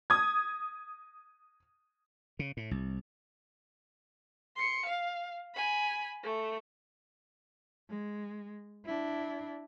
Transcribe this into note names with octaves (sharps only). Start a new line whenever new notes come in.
D#6 G#6
C#3
A2
C2
C6 C#7
F5
G#5 B5
A3
G#3
D4 E4